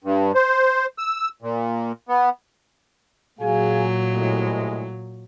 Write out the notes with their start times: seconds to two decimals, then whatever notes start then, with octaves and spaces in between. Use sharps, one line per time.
0.04 G2
0.35 C5
0.98 E6
1.42 A#2
2.09 B3
3.40 A#2 F#3 G#4 F5 G#5
4.11 C2 A2 G#3